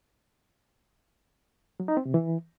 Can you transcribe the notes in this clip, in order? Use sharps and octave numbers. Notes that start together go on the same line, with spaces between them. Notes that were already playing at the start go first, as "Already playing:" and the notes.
F#3
D#4
C4
C3
E3